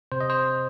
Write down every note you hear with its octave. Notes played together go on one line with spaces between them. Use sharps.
C3 C5
D#5
C5